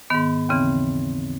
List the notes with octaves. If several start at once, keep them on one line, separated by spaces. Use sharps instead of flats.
G#2 D#3 B3
D#2 C#3 E3 C4